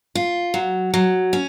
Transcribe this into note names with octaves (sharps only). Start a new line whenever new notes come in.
F4
F#3
F#3
C#4